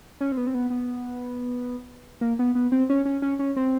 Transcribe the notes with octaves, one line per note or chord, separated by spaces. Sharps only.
C#4
C4
B3
C4
B3
B3
A#3
B3
B3
C4
C#4
C#4
C#4
C#4
C4